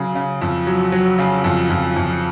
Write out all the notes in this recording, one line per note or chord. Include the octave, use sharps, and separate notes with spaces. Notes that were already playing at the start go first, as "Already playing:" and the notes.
Already playing: C#3 F#3
C#3
F2
F#3
F#3
C#3
F2
F2
F2